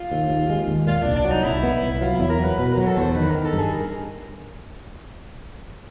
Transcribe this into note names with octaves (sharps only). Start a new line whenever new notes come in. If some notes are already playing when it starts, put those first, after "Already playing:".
Already playing: F4
D#2
D#2
G#3
D#2
A#2 F4
C2 D4
D4
F#3
D#4
C2 E4
B3
C2
F#3 F4
E2 E4
A#4
F#3 B4
B2 B4
F#3 A#4
A4
E2 C5 C#5
D#3 B4
D#3 A#4
A4
G2
G#4
A#4